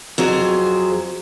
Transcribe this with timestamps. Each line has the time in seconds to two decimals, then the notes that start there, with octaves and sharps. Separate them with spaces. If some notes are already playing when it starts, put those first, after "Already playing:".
0.18 F2 F#3 G#4 C5